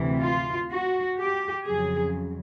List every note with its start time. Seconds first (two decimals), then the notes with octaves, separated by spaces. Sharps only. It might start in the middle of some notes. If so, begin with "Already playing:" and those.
Already playing: D2 C3 E3
0.20 F4
0.68 F#4
1.16 G4
1.66 F2 C#3 F#3 G#4